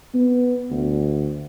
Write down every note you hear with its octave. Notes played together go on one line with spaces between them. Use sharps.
B3
D2